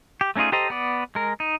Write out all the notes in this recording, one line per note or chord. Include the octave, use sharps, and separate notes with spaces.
G4
A3 C#4 D#4 F4 G#4
G4 A4 C5 D#5 A#5
B3 D5
G#3 A#4
D#4